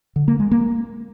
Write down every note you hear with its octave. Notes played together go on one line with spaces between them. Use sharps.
D3
A#3
G#3
A#3